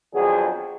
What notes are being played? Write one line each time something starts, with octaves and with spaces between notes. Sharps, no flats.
F2 D3 F#3 B3 G#4